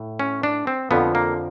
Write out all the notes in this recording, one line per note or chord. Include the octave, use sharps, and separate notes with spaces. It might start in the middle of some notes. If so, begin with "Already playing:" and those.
Already playing: A2
C#4
D4
C4
F2 D3 F3 B3
A#3